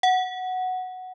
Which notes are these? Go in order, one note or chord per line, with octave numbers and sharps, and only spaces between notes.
F#5